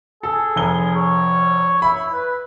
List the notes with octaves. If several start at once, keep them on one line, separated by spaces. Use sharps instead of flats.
G#4 A4
F1 G7
C#5
E4 B5
B4